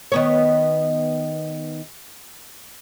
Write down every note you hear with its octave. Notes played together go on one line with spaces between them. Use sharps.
D#3 B3 C#5